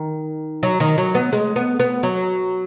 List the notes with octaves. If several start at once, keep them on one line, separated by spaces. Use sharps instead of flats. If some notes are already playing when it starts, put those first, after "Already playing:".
Already playing: D#3
F#3
D#3
F#3
B3
G#3
B3
B3
F#3